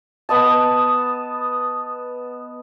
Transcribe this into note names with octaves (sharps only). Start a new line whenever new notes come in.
B3 D#5 A5